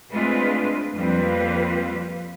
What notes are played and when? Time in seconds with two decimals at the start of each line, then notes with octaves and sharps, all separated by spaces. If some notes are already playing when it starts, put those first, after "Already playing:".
0.12 G#3 A3 C4 D4 F4 B4
0.95 F2 G3 A#3 C4 F4 B4